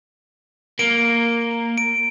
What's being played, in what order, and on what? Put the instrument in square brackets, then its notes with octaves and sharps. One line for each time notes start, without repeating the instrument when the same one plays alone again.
[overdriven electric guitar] A#3 [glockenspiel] D7
[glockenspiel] D7